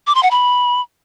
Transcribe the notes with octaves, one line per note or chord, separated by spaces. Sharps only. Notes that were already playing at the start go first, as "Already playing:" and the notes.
D6
C6
F#5
B5